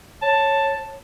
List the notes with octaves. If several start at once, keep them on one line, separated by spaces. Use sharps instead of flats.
C#5 A5